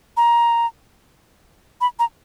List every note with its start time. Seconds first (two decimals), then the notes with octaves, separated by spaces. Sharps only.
0.17 A#5
1.81 B5
1.99 A#5